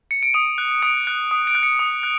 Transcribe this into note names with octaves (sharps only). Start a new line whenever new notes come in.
C#7
D7
D#6 D#7
F#6
D#6 D7
F#6
D#6
D7
F#6
C#7
D#6
F#6